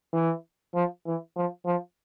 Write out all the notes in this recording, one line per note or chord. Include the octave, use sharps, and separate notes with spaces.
E3
F3
E3
F3
F3